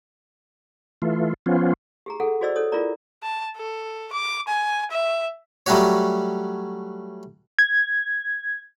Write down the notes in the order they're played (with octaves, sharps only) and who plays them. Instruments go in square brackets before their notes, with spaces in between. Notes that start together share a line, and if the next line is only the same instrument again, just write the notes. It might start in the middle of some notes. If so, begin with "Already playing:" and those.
[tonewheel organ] E3 A3 F4
F3 B3 C#4 F4
[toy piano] G4 G#4 A#5
G#4 A4 F#5
F#4 G#4 C5 D5 D#5 E6
A4 C#5 D#6
E4 F4 G#4 A#4 D5 A#5
[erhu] A5
A4
D6
G#5
E5
[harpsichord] F#3 G3 A3 C#4 F#4 C#5
[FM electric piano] G#6